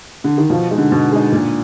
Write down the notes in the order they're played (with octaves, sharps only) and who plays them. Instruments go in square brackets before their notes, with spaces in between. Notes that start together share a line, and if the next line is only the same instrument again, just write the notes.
[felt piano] D3
D#3
[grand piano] B2 [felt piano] F3
[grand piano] G#3 D#4
[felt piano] D3
[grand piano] B2
G#3 D#4
A#2